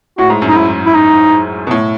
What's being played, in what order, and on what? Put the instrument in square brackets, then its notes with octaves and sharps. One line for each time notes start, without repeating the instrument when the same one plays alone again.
[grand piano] A2 [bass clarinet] F#4
[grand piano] G#2
F#2
[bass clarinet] D#4
[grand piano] G#2 [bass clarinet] E4
[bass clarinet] E4
D#4
[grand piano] B2
A2